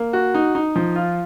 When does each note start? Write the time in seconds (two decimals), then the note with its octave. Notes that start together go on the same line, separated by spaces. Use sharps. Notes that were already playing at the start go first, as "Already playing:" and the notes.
Already playing: A#3
0.13 F#4
0.34 D#4
0.55 D#4
0.76 F3
0.96 F4